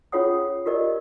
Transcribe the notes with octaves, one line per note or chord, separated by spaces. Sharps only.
C#4 F4 G#4 C#5 F#5 D#6
F4 G4 A#4 D5 D#5